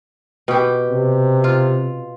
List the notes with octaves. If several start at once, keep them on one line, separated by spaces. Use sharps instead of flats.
B2 G4
C3
F4